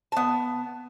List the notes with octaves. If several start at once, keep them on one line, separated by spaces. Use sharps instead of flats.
B3 A5